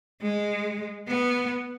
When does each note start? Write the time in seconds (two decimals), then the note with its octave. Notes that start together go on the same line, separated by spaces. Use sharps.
0.21 G#3
1.08 B3